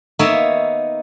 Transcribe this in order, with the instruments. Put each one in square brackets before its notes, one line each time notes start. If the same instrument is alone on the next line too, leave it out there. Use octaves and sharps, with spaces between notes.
[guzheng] A#3 B3 D#4 C#5 E5